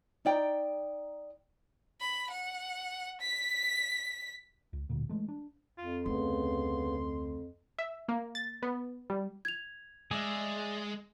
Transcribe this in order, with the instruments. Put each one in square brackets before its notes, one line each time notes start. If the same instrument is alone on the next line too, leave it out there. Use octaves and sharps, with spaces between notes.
[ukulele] D#4 D5 G5 A#5
[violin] B5
F#5
B6
[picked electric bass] C#2
D1 D2 A#2
E3 G#3 A3
D4
[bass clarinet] F2 [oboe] F4
[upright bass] D2 [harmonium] C#3 B3 [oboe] C6
[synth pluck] E5
A#3
A6
B3
G3
[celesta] G#6 F7
[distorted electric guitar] G#3 [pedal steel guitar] G#4 D5 E5